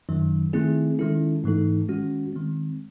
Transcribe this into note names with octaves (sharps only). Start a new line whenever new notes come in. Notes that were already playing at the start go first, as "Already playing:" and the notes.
F#2 D#3 F#3
D#3 A3 C4 E4 G#4
D#3 G#3 C#4 E4 A4
G#2 E3 A3 D#4 A4
D#3 G#3 C#4 F#4
D#3 G#3 C4